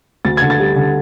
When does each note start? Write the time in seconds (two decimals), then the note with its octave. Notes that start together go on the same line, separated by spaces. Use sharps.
0.25 D2 A6
0.37 D3 G#6
0.50 A6
0.59 G3
0.76 D3